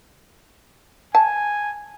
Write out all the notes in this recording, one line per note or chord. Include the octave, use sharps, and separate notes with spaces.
G#5 A5